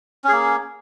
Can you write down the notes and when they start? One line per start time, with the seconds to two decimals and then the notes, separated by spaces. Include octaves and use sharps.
0.24 C#4
0.28 G#4
0.32 A#3